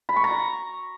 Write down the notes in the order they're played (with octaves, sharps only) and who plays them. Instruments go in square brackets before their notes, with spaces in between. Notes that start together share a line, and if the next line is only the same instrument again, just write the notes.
[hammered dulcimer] B5
C#6
A#5